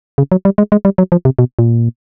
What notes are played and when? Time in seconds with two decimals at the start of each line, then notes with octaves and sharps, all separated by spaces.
0.18 C#3
0.32 F#3
0.45 G3
0.58 G#3
0.72 G#3
0.85 G3
0.98 F#3
1.12 F3
1.25 C3
1.39 B2
1.59 A#2